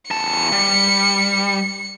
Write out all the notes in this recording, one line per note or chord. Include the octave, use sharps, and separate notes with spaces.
E2 A5 C#7
G3